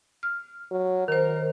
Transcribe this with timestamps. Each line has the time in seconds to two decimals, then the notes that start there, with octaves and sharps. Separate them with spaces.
0.23 F6
0.71 F#3
1.08 D#3 A#4 C5